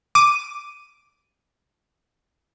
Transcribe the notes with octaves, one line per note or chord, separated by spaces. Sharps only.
D6 D#7